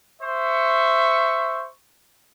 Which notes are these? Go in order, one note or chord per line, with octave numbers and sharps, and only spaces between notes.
C5 E5 C#6